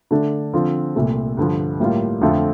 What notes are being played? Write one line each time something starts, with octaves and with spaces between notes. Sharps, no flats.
D3 A3 D4
D3 F3 C4 F4
C2 A#2 A3
G2 D3 F3
A2 G3 A#3 F4
F2 D3 A3 C4 F4